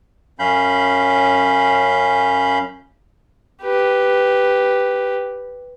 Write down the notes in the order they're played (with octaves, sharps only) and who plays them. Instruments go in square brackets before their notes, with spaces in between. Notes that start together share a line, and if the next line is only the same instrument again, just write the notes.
[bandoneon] F#2 C#4 F5 B5 G6
[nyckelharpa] G4 B4